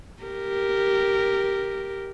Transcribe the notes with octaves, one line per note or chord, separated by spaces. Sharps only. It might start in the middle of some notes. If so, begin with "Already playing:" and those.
G4 A#4